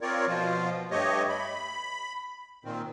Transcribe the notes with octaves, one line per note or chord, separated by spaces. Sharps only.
C4 F4 A#4 C#5 D5
B2 F3 F4
G2 A3 G4 C#5 D#5
B5
A#2 D#3 C4